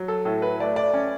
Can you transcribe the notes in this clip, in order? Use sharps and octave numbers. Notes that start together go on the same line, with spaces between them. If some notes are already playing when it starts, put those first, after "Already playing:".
Already playing: F#3
A4
A2 A4
B4
A3 D5
D5
C#4